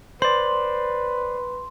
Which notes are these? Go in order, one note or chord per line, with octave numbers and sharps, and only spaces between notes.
B4 C5 D5 C6